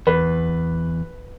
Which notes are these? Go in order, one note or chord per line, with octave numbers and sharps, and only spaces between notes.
E2 B4